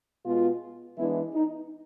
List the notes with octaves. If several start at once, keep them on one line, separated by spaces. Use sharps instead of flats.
B2 G#3 B3 F4
E3 G#3 B3 D4 E4
D#4